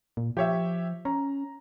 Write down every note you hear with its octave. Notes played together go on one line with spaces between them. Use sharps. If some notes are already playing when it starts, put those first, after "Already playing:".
A#2
F3 G4 C#5 E5
C#4 A#5